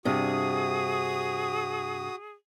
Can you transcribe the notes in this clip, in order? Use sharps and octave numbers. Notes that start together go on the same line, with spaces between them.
G2 C3 F#4 G#4 D#6